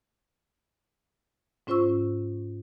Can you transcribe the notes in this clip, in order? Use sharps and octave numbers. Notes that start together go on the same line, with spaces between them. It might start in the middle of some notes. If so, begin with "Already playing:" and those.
G#2 C#4 F4 C5 C#6 E6